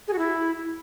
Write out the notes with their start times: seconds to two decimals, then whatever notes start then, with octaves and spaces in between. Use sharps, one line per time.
0.08 G#4
0.13 F#4
0.19 E4